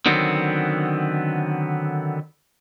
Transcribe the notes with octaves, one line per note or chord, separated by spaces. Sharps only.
D3 D#3 F#3 B3 C4